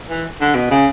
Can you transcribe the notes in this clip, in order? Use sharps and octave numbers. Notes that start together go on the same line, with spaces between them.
E3
D3
B2
C#3